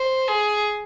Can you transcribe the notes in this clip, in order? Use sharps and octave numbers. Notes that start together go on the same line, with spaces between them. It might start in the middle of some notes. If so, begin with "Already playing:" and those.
Already playing: C5
G#4